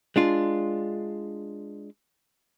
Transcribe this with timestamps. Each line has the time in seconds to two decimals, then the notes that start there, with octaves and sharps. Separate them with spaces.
0.16 G#3 D4 F4